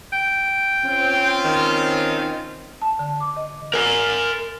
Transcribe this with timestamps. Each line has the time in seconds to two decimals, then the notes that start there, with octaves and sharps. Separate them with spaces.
0.13 G5
0.85 C4 C#4 F4
1.45 D#3
2.82 A5
2.99 D3
3.20 D6
3.37 D#5
3.74 A#4 G#5